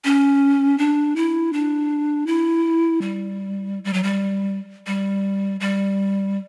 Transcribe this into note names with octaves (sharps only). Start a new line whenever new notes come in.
C#4
D4
E4
D4
E4
G3
G3
F#3
G3
G3
G3